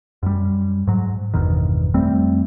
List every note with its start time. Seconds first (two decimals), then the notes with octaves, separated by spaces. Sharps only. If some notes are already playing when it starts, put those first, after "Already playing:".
0.23 F#2 G3
0.87 G#2 F#3
1.34 G1 E2 B2 D#3
1.94 F2 G3 A3 C4